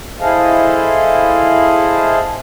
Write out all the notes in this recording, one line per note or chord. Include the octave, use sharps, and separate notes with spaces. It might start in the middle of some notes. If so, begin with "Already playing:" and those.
E4 G#4 A4 C5 D#5 F5